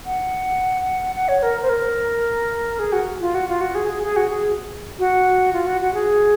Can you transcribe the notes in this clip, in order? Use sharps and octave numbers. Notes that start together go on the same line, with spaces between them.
F#5
F#5
C#5
A#4
C5
A#4
G#4
F#4
F4
F#4
F4
F#4
G#4
G#4
G#4
F#4
G#4
F#4
F4
F#4
F#4
G#4